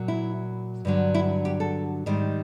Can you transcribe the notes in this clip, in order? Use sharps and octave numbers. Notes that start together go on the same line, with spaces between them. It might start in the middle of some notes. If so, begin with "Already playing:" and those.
Already playing: A#2 F#3
E4
G2 D3 F#3
E4
G4
A4
G#2 D#3 G3